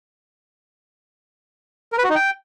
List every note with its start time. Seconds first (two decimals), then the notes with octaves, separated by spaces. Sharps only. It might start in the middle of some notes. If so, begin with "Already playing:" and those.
1.92 A#4
1.98 B4
2.04 F#4
2.09 D#4
2.15 G5